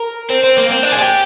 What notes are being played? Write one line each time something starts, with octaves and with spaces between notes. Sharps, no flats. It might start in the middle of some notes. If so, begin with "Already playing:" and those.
Already playing: A#4
C4
C4
A#3
C4
D4
G#4
G4